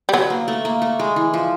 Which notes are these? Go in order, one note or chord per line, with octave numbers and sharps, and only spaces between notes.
G3
F#3 B3
A#3
A3
A#3
A3
G#3
E3
F3